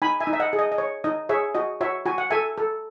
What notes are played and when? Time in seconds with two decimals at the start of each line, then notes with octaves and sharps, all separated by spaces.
0.02 D#4 G#5 B5
0.20 E5 G#5
0.27 D#4
0.33 E5
0.40 D#5 F#5
0.53 G#4
0.59 D#5
0.72 D#5
0.78 C#5
1.04 D#4 D#5
1.29 G#4 C#5 E5
1.55 F#4 D#5
1.81 F#4 C#5 E5
2.06 F#4 G#5
2.18 F#5
2.30 A4 E5 G#5
2.58 A4